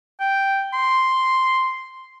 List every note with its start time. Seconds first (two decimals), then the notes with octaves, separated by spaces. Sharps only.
0.20 G5
0.73 C6